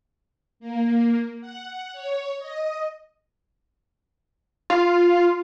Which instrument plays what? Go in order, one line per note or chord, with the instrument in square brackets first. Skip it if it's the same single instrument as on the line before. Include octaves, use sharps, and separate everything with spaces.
[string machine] A#3
F#5
C#5
D#5
[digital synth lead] F4